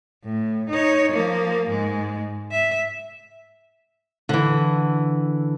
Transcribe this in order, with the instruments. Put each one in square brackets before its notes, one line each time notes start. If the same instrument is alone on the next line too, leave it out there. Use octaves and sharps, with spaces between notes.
[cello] A2
D#4 C#5
F3 A#3
G#2 G#3
E5
[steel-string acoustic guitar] D3 E3